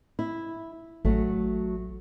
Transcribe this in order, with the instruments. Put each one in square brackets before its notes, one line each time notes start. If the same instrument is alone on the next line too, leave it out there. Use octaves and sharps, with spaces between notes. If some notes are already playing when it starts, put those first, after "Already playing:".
[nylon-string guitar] E4
[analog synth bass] A1 [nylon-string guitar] F#3 A3